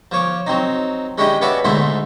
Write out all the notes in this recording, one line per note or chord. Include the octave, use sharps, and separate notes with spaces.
F3 C#5 D6
F#3 C4 D#4
G#3 C#4 D4 E4 G4 D#5
B3 C#4 F#4 D5 E5 F#5
D2 G#2 A3 D#4 E4 C6